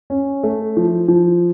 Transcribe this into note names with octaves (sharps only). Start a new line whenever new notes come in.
C#4
A3
F3
F3